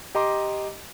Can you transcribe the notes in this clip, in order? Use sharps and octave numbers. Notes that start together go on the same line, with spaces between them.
G4 D#5 A#5 C6 D6